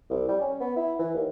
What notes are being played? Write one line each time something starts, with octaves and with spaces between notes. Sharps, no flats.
C2
G3
C#4
B3
E4
E3
D#2